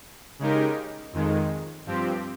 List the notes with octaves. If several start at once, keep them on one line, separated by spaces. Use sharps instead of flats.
C#3 G#3 D#4 G4 A#4
F2 D#3 G#3
G2 F3 C4 G4